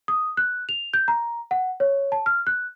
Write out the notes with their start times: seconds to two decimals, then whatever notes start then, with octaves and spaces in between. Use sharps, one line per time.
0.08 D#6
0.37 F#6
0.69 F7
0.94 G6
1.08 A#5
1.51 F#5
1.80 C#5
2.12 A5
2.26 F6
2.47 F#6